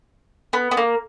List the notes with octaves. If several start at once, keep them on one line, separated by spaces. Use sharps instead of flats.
B3
B3
A#3